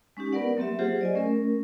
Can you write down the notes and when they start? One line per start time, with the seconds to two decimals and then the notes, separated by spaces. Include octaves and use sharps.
0.17 G#3 C#4 D#4 G4
0.33 B3 A#4 B4 D5 F#5
0.57 F#3 A#3 C4 G4 E5
0.79 F#3 F4 G4 G#4 C5 F#5
1.01 D5 D#5 G#5
1.15 A3 C#4 A#4